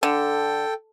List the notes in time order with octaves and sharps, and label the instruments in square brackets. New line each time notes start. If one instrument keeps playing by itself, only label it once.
[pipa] D3 [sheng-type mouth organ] A4 G5